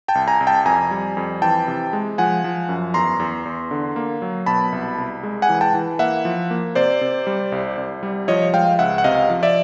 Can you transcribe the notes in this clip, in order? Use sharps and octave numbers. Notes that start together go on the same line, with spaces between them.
G5 A5
C2
G#5 A#5
C2
G5 A5
F2 G#5 A#5
G3
F2
E3 G5 A5
C3
G#3
F3 F#5 G#5
F3
F#2
E2 A#5 C6
E2
E2
D3
A#3
F#3
B2 A5 B5
C2
C2
G#3
F#5 G#5
E3
G5 A5
E3
A#3 E5 F#5
F3
A#3
C3 C5 D5
C3
G3
C2
C2
G3
F3 C#5 D#5
G#3 F5 G5
C#2 E5 F#5
F#5
C3 D#5 F5
F3
D5 E5